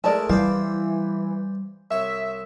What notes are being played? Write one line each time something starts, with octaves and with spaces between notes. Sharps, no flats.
G#3 A3 E4 A#4 D5 A5
E3 G3 C5 D5 F5 G5
C2 C#5 E5